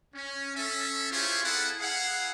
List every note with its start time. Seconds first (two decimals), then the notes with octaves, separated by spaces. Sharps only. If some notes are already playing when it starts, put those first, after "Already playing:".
0.15 C#4
0.55 C#4 A4 E5
1.11 E4 F4 G4 G#4 C5 C#5
1.43 C4 E4 G#4 A4 F5 F#5
1.80 E4 G#4 F5 F#5